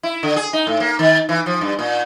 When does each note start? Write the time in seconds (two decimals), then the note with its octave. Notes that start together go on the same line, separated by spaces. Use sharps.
0.03 E4
0.23 D3
0.36 G#4
0.53 D#4
0.67 A2
0.80 A#3
0.99 D#3
1.29 E3
1.46 F3
1.61 G2
1.79 A#2